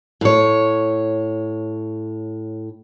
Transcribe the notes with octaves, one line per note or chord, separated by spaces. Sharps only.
A2 C#5